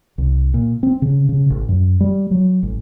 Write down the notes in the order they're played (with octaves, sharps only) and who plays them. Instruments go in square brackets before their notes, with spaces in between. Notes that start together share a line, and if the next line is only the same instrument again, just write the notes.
[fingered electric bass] C2
A#2
C4
C#3
C#3
A1
F#2
G3
F#3
A1